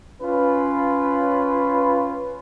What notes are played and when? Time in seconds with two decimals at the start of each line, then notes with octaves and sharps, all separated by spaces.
0.21 C#4 F4 B4